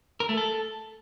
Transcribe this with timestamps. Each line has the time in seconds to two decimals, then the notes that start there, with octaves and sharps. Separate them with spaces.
0.20 A#4
0.29 A3
0.38 A4